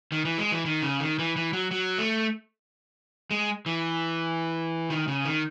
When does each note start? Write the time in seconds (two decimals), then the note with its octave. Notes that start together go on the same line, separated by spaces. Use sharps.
0.12 D#3
0.25 E3
0.38 G#3
0.52 E3
0.65 D#3
0.82 C#3
1.00 D#3
1.19 E3
1.36 E3
1.53 F#3
1.71 F#3
1.98 A3
3.31 G#3
3.66 E3
4.90 D#3
5.08 C#3
5.25 D#3